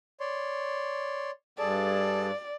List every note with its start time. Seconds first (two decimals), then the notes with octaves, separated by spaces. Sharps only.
0.20 C#5 D5 C6
1.59 G2 G#4 A4 D5 A5